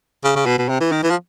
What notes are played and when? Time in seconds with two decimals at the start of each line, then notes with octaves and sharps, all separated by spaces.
0.24 C#3
0.36 C#3
0.46 B2
0.58 B2
0.69 C3
0.80 E3
0.92 D#3
1.03 E3
1.10 F3